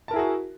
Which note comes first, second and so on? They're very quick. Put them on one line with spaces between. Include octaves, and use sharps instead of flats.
A5 A#4 E4 G#4 F#4